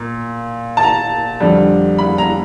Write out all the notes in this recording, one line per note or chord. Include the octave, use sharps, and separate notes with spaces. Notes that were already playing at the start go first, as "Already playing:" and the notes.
Already playing: A#2
A5
A#5
F2 D3 G3
B5
A#5